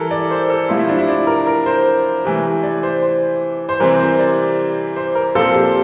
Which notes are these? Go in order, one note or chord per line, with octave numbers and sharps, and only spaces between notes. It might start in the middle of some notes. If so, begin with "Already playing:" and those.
Already playing: E3 G3 A4 A#4
D5
C5
A4
C3 F3 A3 C4 E4
E4
D4
E4
D5
A#4
A#4
C5
C3 E3 A3
D5
C5
C5
C5
C3 E3 G3 C4 A#4
C5
D5
C5
A#4
A#2 F3 C4 A4
G4